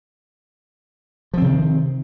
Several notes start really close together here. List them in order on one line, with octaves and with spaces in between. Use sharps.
F3 C4 C3 D#3